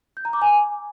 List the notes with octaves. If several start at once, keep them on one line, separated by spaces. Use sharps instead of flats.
G6
A#5
D6
G#5